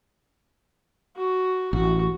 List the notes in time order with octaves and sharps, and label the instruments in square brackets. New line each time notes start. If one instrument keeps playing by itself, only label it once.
[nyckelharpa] F#4
[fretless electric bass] A1 [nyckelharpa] F#4